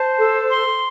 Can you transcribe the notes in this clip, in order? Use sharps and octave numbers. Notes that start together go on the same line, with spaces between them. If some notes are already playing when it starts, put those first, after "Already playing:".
Already playing: C5 A5
A4
C6